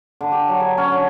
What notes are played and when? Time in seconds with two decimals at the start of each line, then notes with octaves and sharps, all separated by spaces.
0.21 D3
0.32 G4
0.48 F#3
0.60 G#5
0.78 C#4
0.92 D3